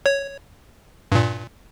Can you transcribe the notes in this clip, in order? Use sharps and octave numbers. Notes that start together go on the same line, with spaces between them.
C#5
G2 A#2